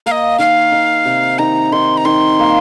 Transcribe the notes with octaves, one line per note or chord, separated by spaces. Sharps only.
A#3 F5
D#5
D#3 F5
D#3
C3
D#3 A#5
D#3 C6
A#5
D#3 C6
A#3